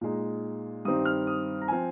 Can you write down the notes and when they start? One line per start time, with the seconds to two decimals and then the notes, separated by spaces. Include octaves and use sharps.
0.01 A#2 G#3 D#4
0.85 G2 D#3 G3 C4 D#4 D#6
1.05 F6
1.27 D#6
1.62 A#5
1.68 F3 C4 G#5